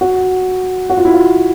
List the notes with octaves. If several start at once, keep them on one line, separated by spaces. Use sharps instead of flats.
F#4
F#4
F4
E4
F4